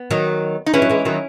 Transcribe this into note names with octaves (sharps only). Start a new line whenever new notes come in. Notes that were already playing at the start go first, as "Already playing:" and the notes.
Already playing: B3
D#3 F#3
D#4
E3 G#3 C#4 E4
F#3
E3 G#3
D#3 F#3